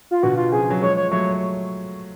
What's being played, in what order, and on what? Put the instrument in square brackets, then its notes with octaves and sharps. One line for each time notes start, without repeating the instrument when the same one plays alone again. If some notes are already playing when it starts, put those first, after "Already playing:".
[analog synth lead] F4
[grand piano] B2 D3 [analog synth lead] F#4
[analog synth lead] F4
[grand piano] C#3 F3 [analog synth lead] G#4
[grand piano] F#3
[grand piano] F3 G#3 [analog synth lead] C#5
[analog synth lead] C#5
[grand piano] F#3 A3 [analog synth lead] C#5